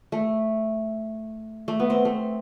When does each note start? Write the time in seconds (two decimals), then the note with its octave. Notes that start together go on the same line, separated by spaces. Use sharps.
0.12 A3
1.68 A3
1.80 B3
1.90 C4
2.05 A3